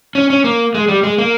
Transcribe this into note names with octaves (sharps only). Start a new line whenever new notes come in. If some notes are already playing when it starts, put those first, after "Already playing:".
C#4
C#4
A#3
G#3
G3
G#3
A#3